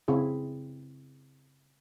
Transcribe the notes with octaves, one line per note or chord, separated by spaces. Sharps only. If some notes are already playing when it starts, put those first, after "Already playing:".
C#3 C4 E4 G#4